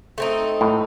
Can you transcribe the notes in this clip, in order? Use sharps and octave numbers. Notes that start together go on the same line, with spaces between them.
A3 C4 D#4
A2